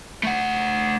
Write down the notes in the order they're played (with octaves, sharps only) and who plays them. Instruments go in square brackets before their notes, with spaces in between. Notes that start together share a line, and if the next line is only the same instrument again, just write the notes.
[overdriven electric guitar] A3 F#5